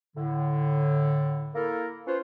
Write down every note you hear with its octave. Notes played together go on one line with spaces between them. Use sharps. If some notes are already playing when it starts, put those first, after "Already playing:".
A2 D3
A#3 E4 A4 A#4
C#4 F4 B4 C5